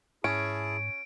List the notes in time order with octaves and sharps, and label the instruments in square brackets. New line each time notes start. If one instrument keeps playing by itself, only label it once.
[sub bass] G#2 [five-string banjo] C#4 [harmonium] E4 G#4 A5 [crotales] D7